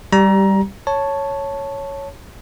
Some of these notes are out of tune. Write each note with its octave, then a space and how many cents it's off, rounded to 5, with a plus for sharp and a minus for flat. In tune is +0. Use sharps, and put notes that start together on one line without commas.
G3 +0 G4 -20 A#5 +20
C#5 +0 A5 +0